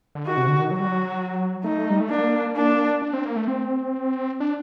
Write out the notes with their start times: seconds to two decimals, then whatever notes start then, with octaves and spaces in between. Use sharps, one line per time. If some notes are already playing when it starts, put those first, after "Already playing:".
0.15 D3
0.25 D#3 F#4
0.37 C3
0.48 D3
0.60 D#3
0.71 F#3 F#4
0.80 G3
0.88 F#3
1.64 A3 D#4
1.90 G3
2.00 A3
2.09 A#3 D4
2.56 D4
3.02 D4
3.14 C4
3.25 A#3
3.36 A3
3.48 C4
4.40 D4